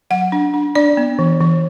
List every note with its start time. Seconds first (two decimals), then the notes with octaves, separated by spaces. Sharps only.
0.10 F#3 F#5
0.32 D4
0.54 D4
0.75 D4 D5
0.97 B3
1.19 E3
1.40 E3